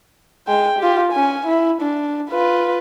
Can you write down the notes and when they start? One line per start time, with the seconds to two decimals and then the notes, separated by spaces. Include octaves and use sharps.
0.48 G#3 G5
0.79 F4 G4
1.12 C#4 G#5
1.46 E4
1.81 D4
2.30 F4 B4